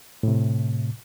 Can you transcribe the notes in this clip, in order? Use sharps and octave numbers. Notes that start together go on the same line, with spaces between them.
A2 C3